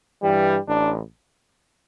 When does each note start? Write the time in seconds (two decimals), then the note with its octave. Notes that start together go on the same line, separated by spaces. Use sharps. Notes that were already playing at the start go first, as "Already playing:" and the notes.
0.23 G2 E3 G3
0.66 A1 D4